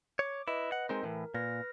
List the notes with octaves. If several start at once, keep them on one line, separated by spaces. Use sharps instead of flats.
C#5 D6
E4 B4 D#5
F#5
G#3 C4 D#4 A#4
A2 E3
A#2 B4 F6 A#6